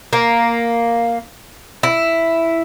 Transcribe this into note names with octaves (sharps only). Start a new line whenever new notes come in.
A#3
E4